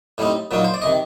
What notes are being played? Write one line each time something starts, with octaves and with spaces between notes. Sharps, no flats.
A2 G3 C4 D#4
A#2 F#3 A#3 D#4
C5
D5
C3 D#3 D#5